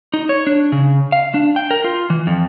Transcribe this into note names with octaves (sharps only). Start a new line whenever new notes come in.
D#4
C#5
D4
C#3
F5
D4
G5
A#4
F4
E3
F2